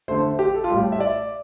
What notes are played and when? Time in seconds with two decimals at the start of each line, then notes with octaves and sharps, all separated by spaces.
0.08 D3 A3 C5
0.39 G4
0.54 A4
0.64 F4
0.70 A2 G3 G4
0.92 E5
1.00 D5